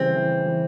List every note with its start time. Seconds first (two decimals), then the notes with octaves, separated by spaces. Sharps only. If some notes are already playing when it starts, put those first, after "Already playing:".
Already playing: C#3 E3 G3 C4
0.16 E3
0.46 E3